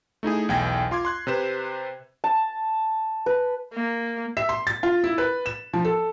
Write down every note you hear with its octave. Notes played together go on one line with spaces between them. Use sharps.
A3 D#4 E4 G#4
B1 E2 G5 G#5 G#6 A#6
F4 C6 D6 G#6
C6 F#6 G#6
C3 B4 C5 E7
A5
B4
A#3
E5
C6
A6
F4
E4
B4
E7
F3
A4